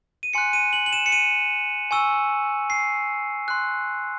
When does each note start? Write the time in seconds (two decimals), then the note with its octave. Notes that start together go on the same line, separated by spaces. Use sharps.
0.23 D#7
0.33 G#5 C6 F#6 C#7
0.53 D#7
0.73 F#7
0.86 F#7
0.93 E7
1.06 C#7
1.12 D#7
1.91 G#5 C#6 E6
2.70 C7
3.48 C6 F#6